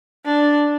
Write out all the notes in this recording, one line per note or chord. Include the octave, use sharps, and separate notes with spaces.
D4